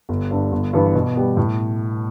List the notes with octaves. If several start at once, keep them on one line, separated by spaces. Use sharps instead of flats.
G1
G2 D3
G1
G2 E3 B3
B2
G3 B3
A2